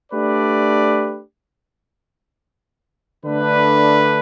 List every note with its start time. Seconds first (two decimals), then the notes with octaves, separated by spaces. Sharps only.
0.11 A3 D4 G4 B4 D5
3.24 D3 A3 D4 B4